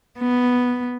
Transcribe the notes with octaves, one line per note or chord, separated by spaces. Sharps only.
B3